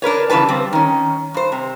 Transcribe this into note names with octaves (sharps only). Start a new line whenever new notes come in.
D4 A#4 B4 C#5
C#3 E3 G3 B4 A5
G3 C4
D#3 C#4
G2 C5
C3